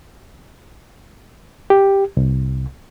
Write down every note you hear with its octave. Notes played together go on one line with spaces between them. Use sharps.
G4
C2